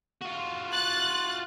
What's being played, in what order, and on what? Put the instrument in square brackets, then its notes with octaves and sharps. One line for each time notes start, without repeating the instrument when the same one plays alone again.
[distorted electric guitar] F4 F#4
[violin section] F#6 A6